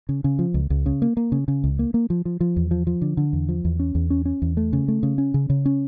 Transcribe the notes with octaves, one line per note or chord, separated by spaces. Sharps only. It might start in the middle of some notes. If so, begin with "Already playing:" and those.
C#3
C#3
F3
C#2
C#2
C#3
A#3
A#3
C#3
C#3
C#2
A#3
A#3
F3
F3
F3
E2
F3
F3
D3
D3
E2
F3
E2
C#4
E2
C#4
C#4
E2
A3
C#3
A3
C#3
C#4
C#3
C#3
C#4